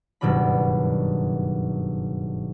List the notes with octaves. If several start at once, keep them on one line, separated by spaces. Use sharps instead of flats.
F#1 G2 B2 D#3 D4 B5